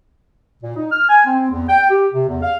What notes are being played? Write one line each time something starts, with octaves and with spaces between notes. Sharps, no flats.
A#2
D#4
F6
G#5
C4
E2
G5
G4
C3
E2
F5